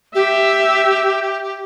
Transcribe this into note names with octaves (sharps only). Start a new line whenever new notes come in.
G4 E5